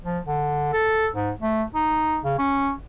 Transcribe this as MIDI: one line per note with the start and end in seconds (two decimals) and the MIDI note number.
0.05 0.19 53
0.27 0.69 50
0.73 1.07 69
1.14 1.31 44
1.41 1.63 57
1.75 2.18 63
2.24 2.35 49
2.39 2.71 61